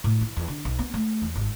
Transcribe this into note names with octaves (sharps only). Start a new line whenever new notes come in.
A2
E4
E2
D3
B1
B3
A3
E2
G#1